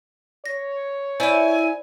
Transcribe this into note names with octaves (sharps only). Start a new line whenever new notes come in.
C#5 A#6
E4 C5 D5 E5 G#5 B5